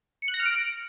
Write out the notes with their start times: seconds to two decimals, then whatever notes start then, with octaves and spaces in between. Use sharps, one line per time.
0.22 C#7
0.28 F#6
0.34 A#6
0.40 F6
0.46 D7